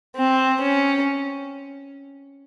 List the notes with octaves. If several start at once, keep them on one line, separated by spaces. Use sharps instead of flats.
C4
C#4